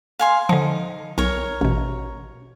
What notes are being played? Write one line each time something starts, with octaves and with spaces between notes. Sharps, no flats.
F5 G#5 C6
D3 F3 D#4
B1 A#4 C#5
A1 B2